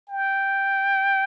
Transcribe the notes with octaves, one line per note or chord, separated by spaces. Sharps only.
G5